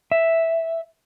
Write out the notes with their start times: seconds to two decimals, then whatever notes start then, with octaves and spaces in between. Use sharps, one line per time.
0.12 E5